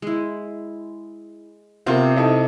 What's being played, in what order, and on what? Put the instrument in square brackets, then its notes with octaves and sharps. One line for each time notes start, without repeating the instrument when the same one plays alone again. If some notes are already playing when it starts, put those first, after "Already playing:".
[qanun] G#3 E4
[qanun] C3 B3 [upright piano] C4 F4 A#4
[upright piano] D#4 E4 A4